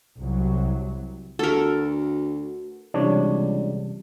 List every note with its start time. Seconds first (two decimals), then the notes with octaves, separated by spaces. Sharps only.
0.18 C2 F#3
1.39 D2 F#4 A4 A#4
2.94 C#2 C3 E3 G3 D4 C#5